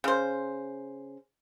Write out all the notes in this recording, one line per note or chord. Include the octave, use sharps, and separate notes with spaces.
C#3 C5